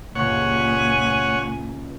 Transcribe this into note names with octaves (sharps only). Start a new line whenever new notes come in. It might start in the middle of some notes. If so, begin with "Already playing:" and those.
C#2 G2 A#2 C#5 F#5 G#5